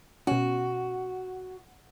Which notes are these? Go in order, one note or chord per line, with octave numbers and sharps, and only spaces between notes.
B2 C#4 F#4